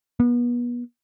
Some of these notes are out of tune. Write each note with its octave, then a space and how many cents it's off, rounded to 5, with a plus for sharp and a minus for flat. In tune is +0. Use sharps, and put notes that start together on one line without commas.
B3 -35